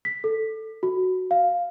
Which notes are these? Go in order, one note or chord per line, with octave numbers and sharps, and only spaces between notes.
B6
A4
F#4
F5